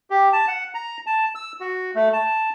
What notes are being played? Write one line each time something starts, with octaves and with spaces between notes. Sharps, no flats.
G4
A5
F#5
A#5
A5
E6
F#4
A3
A5